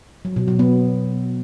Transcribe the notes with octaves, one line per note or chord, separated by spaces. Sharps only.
F#3
B2
F#3
B3